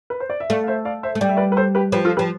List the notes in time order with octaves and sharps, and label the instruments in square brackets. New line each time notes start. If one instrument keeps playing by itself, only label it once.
[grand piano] B4
C5
D5
E5
[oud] A3 [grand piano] D5 F5
[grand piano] F5
C5 E5
D5 F5
C5 E5
[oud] A3
[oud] G3 [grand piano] D5
[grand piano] E5
B4 D5
B4
A4 C5
G4 B4
[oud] F3 [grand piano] G4 B4
[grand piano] F4 A4
[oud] F3 [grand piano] G4 B4